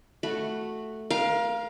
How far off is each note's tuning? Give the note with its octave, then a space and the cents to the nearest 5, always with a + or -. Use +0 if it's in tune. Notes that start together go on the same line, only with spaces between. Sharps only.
A3 +0 F#4 +0 B5 +0
A#4 +30 F5 -5